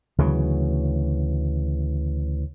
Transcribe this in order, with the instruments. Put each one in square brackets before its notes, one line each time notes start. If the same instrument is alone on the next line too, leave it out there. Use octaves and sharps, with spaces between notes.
[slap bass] D2 C#3 E3 F#3